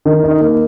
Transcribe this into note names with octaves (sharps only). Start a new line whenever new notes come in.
D#3
D#4
A#3